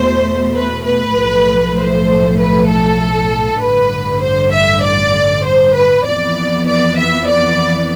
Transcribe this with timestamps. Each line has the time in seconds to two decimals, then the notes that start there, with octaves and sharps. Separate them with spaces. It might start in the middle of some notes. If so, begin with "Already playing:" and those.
Already playing: E2 B2 A3 C5
0.55 B4
0.86 B4
1.16 B1 A2 F3 A3
1.77 C5
2.39 B4
2.68 A4
3.60 A1 G2 D3 B4
4.22 C5
4.52 E5
4.83 D5
5.44 C5
5.75 B4
6.05 F2 E3 B3 D5
6.67 D5
6.98 E5
7.27 D5